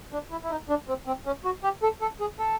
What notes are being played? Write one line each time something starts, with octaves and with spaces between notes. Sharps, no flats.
D4
E4
E4
D#4
D4
C4
C4
C#4
F#4
G4
A4
A4
G#4
A4